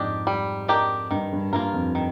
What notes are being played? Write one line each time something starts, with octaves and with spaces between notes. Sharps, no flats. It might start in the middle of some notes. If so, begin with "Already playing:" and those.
Already playing: F2 G#2 D4 G4 D#5
G3
D4 G4 A#4 D#5
G2 D#3
G2
G2 A#3 F4 A#4
F2
D#3